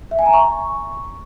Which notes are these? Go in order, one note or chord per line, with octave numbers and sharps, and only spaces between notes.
E5
G#5
A#5
C#6